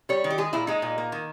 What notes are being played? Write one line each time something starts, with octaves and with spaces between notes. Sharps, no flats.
G3 C#5
D#3
G4
G#3 G#4
A#2 E4
G#3 D#4
A#2
A#3
D#3